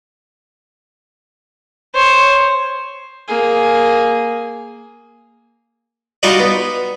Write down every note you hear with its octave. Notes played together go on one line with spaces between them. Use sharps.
C5 C#5
A#3 G#4
G3 D#4 F4 F#4 D5 D#5
B3